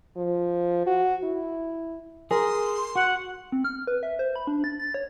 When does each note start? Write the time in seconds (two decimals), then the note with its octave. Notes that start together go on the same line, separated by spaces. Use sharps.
0.17 F3
0.86 F#4
1.24 E4
2.31 G#4 A#4 C6
2.96 F#4 F#5
3.52 C4
3.65 F6
3.87 B4
4.03 E5
4.19 C5
4.36 B5
4.47 D4
4.64 A6
4.80 A6
4.94 C#5